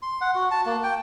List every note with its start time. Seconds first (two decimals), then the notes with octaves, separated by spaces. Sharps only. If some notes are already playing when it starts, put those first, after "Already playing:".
0.02 C6
0.21 F#5
0.35 F#4
0.51 A5
0.66 A#3
0.83 G5